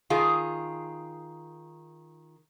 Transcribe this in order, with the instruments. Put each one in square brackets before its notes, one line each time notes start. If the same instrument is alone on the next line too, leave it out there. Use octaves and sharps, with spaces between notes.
[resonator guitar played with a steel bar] D#3 F4 G#4